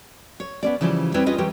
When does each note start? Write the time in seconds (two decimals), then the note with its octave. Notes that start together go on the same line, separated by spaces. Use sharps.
0.40 C#5
0.63 B3 C#4 D5
0.81 C#3 E3 F3 G3
1.14 G3 C4 E4 B4 C#5
1.26 C#4 F4 G#4 B4 D#5
1.38 E3 G3 G4 A#4 C#5